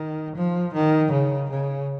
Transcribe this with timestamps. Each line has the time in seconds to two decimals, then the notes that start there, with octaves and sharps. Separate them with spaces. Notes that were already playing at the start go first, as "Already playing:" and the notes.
Already playing: D#3
0.35 F3
0.73 D#3
1.12 C#3
1.50 C#3